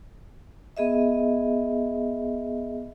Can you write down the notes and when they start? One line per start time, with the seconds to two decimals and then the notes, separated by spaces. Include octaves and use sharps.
0.77 B3 G#4 D#5 E5